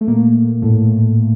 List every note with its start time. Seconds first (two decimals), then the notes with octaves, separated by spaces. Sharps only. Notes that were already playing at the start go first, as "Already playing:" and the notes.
0.01 A3
0.07 A#2 A#3
0.62 A2 A3